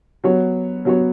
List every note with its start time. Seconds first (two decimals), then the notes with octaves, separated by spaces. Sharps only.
0.24 F#3 B3 F#4 C#5
0.85 F#3 B3 F#4 C#5